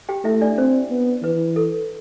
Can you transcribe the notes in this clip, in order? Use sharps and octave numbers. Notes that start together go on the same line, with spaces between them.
G4 G5
A3 E4 E5
D4 D5
C4 C5
B3
E3 B4
A4